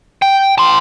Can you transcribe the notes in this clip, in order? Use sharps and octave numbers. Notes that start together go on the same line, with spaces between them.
G5
A5 C6